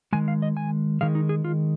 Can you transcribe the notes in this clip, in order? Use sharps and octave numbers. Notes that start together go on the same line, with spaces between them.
D#3 G#3 G#5
F5
D#5
G#5
D#3 G#3 F5
D#4
G#4
F4